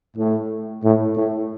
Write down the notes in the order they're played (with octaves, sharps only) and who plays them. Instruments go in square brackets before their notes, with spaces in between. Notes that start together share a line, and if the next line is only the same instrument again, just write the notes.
[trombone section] A2
A2
A2